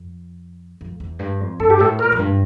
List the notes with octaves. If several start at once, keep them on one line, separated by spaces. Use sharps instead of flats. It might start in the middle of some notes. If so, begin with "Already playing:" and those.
Already playing: F2
F2
E2
G2
F2
G2 A4
G4
A2 A4
A#2 A#4
F2
G2